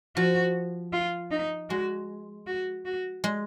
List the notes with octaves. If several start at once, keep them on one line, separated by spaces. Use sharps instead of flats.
F3 F#4
F4
D#4
G#3 F#4
F#4
F#4
G#3